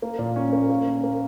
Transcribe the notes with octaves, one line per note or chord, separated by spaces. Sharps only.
A#3
A#2
C#4
A#3
A#3
C#4
A#3